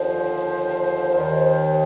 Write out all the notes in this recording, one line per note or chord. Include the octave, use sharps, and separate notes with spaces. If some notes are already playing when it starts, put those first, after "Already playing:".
Already playing: D#2 D3 F3 C5
D#2 D#3